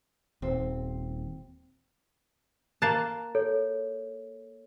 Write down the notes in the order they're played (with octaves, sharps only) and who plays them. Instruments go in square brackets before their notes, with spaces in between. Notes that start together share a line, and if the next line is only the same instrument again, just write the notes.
[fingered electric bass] D#1 [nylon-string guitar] C4
[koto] A#3 A5 [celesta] F#6 A6 C7
[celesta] A4 C#5